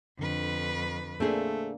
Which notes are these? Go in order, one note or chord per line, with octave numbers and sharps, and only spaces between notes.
F2 D3 B4
A3 A#3 C4 D4 G#4